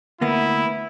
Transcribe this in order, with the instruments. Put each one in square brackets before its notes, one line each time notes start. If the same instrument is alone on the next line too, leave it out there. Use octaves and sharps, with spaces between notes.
[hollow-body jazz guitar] D2 A#3 B3 [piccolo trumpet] E4